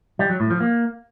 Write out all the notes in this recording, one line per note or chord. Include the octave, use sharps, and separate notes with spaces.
G3
F#3
A2
F3
A#3